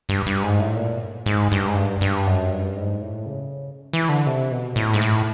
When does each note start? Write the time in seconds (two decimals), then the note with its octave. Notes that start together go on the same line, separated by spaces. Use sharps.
0.09 G2
0.26 G2
0.43 G#2
0.60 A2
0.76 A#2
1.26 G#2
1.52 G2
1.68 G#2
1.76 G2
2.01 G2
2.27 F#2
2.52 G2
2.77 G#2
3.02 A2
3.26 C#3
3.93 E3
4.09 D3
4.27 C3
4.51 B2
4.76 A2
4.94 G#2
5.01 A2